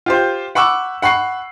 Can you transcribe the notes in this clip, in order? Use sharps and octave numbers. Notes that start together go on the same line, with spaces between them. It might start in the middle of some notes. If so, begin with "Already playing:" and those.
F4 G4 C5
F#5 B5 C#6 D6 E6
F#5 B5 C#6 C7